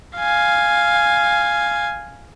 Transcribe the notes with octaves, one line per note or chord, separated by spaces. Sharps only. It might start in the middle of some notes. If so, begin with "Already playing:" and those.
F5 G#5